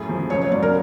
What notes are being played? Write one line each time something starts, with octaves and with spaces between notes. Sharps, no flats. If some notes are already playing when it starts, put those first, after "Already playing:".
Already playing: F#2 A2 G#4
F3
C#2 C#5
C#5
F#3 D5
A#4